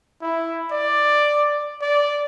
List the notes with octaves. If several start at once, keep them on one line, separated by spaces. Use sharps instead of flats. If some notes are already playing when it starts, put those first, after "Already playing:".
E4
D5
D5